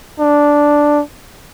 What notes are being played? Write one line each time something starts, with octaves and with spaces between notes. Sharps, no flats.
D4